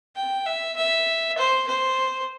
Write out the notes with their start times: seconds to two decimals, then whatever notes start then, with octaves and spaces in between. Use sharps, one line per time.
0.16 G5
0.46 E5
0.76 E5
1.37 C5
1.68 C5